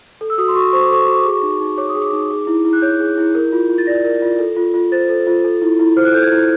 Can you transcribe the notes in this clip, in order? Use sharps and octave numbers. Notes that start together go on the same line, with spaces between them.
A4
E6
F#4 D#6
C6
F#4 C#6
C5 C#6
D6
A4 C#6
F#4 D6
C#6
G#4 D6
C#6
D#4
D#4
C#5 D6
D#6
G#4
D6
D#4
G#4
E4
E4
F#6
C#5 G6
G#4
E4
A#4
F4
F4
A6
D5 A#6
A#4
F4
A4
F4
F4
C5 A6
A4
F4
A4
E4
E4
C5 F6
F#6
A4 G6
G#6
E4